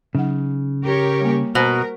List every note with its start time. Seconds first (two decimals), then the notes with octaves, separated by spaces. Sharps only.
0.15 C#3 F#3 D#4 F#5
0.84 G4 A#4 C#5
1.21 G3 A#3
1.55 B2 A#4 C5